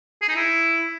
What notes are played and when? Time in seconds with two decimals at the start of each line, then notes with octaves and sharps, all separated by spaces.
0.22 G#4
0.29 D#4
0.35 E4